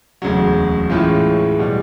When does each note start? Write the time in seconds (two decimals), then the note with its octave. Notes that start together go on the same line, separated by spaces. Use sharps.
0.22 E1 D2 C#3 F#3
0.90 A2 E3 G#3 C#4 F4
1.59 B2 G3